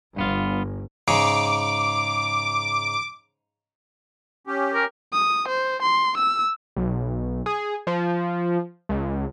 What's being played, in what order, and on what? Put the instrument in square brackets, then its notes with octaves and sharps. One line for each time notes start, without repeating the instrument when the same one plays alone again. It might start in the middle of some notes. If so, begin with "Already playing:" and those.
[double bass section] G1 [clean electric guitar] G2 B3 F4
[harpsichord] G#2 C#3 [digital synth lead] D6
[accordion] C#4 G4
[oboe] A#4
[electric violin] D#6
C5
C6
E6
[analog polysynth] B1
G#4
F3
C#2